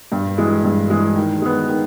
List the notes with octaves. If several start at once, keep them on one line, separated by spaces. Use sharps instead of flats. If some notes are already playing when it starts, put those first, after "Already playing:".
G2
E3 G#3
G2
E3 G#3
D#3
G#3 B3
D#3